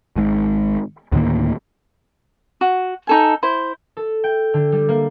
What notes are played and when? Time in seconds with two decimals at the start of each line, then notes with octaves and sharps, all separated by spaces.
0.16 G#1 G#2
1.12 D2 A2 D#3 A#3
2.61 F#4
3.07 D#4 A4 G#5
3.43 E4 C5
3.97 A4
4.24 G5
4.54 D3
4.72 G3
4.89 A#3